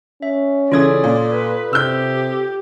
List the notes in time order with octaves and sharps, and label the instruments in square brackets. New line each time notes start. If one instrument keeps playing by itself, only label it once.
[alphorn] C#4 [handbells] E5
[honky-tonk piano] C#3 E3 G#6 [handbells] F4 A4 D#6 [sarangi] D5
[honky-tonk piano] A#2
[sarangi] B4
[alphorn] C3 [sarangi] G4 [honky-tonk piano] E6 G6